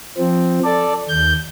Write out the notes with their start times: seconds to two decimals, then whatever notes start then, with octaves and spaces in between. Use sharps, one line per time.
0.18 F3 C4
0.64 A4 D5
1.09 D#2 G6